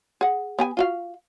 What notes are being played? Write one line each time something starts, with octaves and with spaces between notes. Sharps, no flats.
G#4 F#5
B3 G4 G#5
F4 F#4 F5